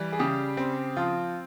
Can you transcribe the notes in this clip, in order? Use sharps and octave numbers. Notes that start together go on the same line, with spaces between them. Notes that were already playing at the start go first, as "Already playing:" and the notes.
Already playing: E3 G3
G#4
C#3 G4
C4
F3 F4